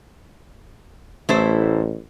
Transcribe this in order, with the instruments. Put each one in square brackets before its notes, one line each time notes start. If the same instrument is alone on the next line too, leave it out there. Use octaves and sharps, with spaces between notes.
[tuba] A1 [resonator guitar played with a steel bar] A3 E4 C5